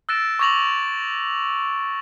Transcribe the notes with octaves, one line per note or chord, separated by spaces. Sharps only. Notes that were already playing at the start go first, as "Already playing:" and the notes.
E6 F#6 A6 A#6 D7 E7
C#6 D6 G#6 A#6 F7 F#7